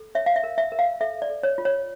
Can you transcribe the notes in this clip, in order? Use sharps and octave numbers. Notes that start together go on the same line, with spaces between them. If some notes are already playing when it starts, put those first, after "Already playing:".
Already playing: A4
C#5 E5
F5
E5
A#4
E5
A#4
F5
A4 E5
D5
A4
C#5
F4
C#5